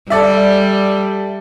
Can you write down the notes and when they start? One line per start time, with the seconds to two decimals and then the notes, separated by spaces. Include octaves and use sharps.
0.10 G3 A4 D5 E5